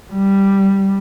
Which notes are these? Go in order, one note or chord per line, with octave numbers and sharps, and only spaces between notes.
G3